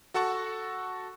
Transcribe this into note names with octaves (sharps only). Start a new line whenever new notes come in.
F#4 A4 F#5 A5 C#6